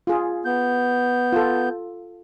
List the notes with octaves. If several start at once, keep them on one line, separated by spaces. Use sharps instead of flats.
F4 G#4
B3 G6
F4 A4